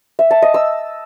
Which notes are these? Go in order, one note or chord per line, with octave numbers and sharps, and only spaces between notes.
E5
A5
D#5
E6